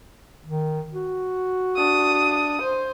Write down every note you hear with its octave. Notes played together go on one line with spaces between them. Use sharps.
D#3
F#4
D4 D#6
C5